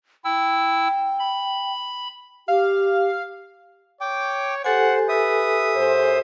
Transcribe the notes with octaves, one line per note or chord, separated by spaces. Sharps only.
E4 G5 E6
B5
G4 F5
C#5 G5 D6
G4 A4 C5 F#5 G#5
B4 E5 D#6
F#2 C5